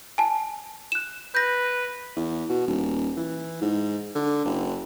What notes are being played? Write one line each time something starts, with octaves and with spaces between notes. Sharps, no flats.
G#5 A5
F#6 E7
B4 G6 A#6
E2
B2
D#1
E3
G#2
D3
F#1